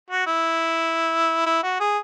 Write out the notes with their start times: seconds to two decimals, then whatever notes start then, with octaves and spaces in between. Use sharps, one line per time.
0.10 F#4
0.27 E4
1.46 E4
1.63 F#4
1.80 G#4